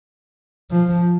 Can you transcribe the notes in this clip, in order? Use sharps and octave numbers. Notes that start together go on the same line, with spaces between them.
F3